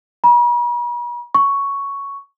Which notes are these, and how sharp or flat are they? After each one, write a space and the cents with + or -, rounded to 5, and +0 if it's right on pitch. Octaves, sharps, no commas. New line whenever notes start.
B5 -45
C#6 +5